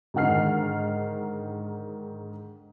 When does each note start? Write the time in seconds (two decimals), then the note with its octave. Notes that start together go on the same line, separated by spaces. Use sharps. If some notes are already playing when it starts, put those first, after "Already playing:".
0.14 G#2 D3 D#3 F#5 F6 C7